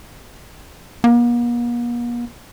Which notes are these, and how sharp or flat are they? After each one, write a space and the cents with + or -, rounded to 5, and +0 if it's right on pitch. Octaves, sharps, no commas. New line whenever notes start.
A#3 +45